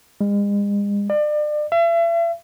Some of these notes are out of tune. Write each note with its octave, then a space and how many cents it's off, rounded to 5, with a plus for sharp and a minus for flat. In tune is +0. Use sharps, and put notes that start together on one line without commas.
G#3 -40
D5 +35
E5 +40